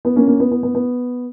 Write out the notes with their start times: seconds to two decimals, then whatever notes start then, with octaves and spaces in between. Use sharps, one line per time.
0.05 B3
0.16 A#3 C#4
0.28 A#3 C#4
0.40 B3
0.51 B3
0.63 B3
0.75 B3